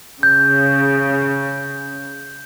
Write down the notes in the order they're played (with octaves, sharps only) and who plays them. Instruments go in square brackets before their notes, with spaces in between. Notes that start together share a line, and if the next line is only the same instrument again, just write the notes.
[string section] C#3 [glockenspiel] G6